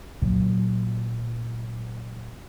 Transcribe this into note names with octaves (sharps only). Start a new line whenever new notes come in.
A#2 F#3